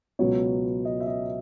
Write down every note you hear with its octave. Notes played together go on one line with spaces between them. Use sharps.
C#2 B2 F#3 B3 C#5
D#5
E5
D#5